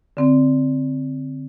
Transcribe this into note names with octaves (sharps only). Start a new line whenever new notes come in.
D3 C4